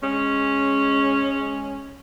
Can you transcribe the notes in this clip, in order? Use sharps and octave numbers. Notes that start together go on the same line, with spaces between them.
G#3 C#4